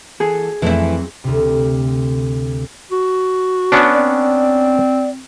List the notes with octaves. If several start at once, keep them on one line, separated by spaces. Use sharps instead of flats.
E3 F#4 G#4 A4
F2 E3 F#3 A3 C4 E4
D2 C3
F#4
B3 C#4 D4
C4 D5